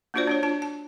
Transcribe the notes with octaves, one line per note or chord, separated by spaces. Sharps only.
A#3 D4 F4 F#4 C5 D5
D4 F4 C#5
D4 F4 A5
A5